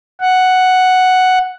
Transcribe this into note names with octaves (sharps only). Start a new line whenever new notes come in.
F#5